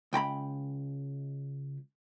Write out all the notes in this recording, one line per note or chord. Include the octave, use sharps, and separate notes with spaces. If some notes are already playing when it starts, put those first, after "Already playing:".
C#2 G5 A#5 B5